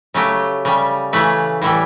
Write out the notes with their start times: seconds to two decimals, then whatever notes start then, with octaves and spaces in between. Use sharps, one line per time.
0.14 C#3 F#3 A3 G4
0.65 C#3 G3
1.13 C#3 E3 A3 B4
1.62 A2 E3 G3